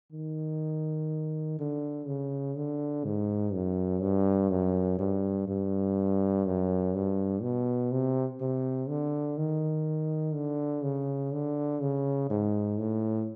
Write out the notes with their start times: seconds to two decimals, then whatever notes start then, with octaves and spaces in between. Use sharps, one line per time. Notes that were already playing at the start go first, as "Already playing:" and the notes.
0.12 D#3
1.59 D3
2.07 C#3
2.57 D3
3.05 G#2
3.54 F#2
4.02 G2
4.51 F#2
4.99 G2
5.48 G2
6.46 F#2
6.95 G2
7.42 B2
7.92 C3
8.41 C3
8.89 D3
9.38 D#3
10.34 D3
10.83 C#3
11.33 D3
11.81 C#3
12.30 G#2
12.79 A2